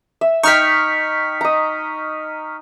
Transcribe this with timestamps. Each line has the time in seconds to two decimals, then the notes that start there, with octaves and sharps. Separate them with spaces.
0.21 E5
0.43 D#4 G5 C#6 F6 B6
1.41 D#5 A#5